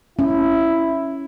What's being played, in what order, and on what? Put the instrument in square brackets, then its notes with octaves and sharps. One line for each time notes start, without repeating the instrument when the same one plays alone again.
[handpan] C#4 [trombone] E4